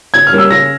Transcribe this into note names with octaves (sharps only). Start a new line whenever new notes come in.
C#3 G#6
F6
G3 A#3 C#4
E6
C#3 A#6